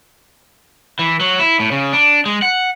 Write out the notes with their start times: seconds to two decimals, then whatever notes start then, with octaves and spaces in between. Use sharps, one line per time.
0.99 E3
1.20 F#3
1.39 E4
1.60 A2
1.71 C#3
1.93 D4
2.26 G#3
2.42 F#5